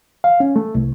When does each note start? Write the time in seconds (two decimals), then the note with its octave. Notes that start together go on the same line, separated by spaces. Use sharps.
0.24 F5
0.40 C#4
0.56 A3
0.75 C2